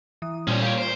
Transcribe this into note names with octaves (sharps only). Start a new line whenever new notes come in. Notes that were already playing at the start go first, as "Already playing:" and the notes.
E3 D#6
A#2 G3 C#4 C5 D5
G4 C#5 F5 G6 D7
C5